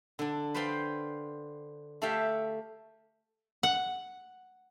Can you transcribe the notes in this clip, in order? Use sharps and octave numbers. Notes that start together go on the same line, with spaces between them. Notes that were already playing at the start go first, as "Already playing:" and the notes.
D3 D4
B4 C5 D5 F5 G5 C6
A3 G4 A4 E5 F5 G5
F#5